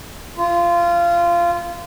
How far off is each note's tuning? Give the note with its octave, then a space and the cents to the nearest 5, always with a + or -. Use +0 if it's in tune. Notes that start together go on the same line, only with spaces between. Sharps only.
F4 -20